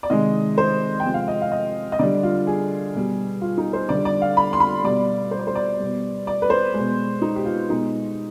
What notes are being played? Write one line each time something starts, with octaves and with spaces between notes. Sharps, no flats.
D5
C3 D#3 G#3 D#5
C5
G5
C3 F3 G#3
F5
D#5
F5
D#5
D#5
D3 G3 D5
F4
G#4
B2 G3
F4
D#4
C5
D3 G3 D5
D5
F5
B5
C6
B5
B2 G3 D5
C5
D5
C5
D5
B2 G3
D5
B4
C5
B2 G#3
D#4
G4
F4
B2 G#3 D#4